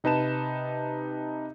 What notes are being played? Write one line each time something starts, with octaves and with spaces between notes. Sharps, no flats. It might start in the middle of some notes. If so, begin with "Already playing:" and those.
C3 D#4 B4 A5 E7